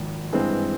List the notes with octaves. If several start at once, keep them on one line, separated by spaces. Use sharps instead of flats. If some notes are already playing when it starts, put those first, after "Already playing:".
Already playing: G#1 G#2 F3 A#3
G2 E3 G#3 C4